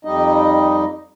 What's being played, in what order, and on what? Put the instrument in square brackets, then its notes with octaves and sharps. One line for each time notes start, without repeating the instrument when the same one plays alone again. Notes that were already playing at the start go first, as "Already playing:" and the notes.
[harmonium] F2 G3 D#4 D#5